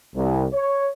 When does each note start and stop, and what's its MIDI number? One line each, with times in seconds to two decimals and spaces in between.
0.15 0.45 36
0.53 0.88 73